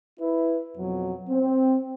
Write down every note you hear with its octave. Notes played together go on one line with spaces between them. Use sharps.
E4 B4
F2 B2 F#3
C4